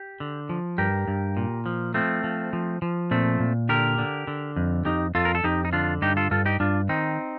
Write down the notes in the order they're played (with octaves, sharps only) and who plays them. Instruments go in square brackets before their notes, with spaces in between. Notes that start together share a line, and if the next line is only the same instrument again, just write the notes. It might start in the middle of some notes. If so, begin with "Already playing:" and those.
Already playing: [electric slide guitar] G4
D3
F3
G2 G4 A#4
G2
A#2
F3
F3 A3 C4
F3
F3
F3
A#2 A3 C4
A#2
D3 G4 A#4
D3
D3
F2
F2 D#4 G4
F2 F4 A4
A#4
A4
F2 D#4 G4
D#4
D3 D4 F4
G2 D#4 G4
F4 A4
G2 F4 A4
D#4 G4
G2 D4 F4
D#3 C4 D#4